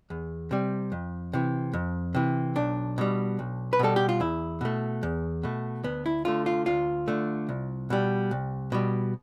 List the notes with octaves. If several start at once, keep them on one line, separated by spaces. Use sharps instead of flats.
E2
C3 G3
F2
C3 E3
F2
C3 E3
B1 D4
B2 G3
B1
B4
B2 G3 A4
G4
F4
E2 E4
B2 A3
E2
B2 A3
D2 B3
E4
D3 A3 F4
F4
D2 F4
D3 A3
C2
B2 G3
C2
B2 G3